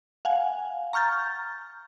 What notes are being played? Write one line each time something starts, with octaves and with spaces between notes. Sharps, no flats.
F5 F#5 G#5
A#5 C#6 F6 G6 A6